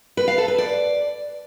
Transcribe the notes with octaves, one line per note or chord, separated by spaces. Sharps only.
B4
F5
A4
B4
D5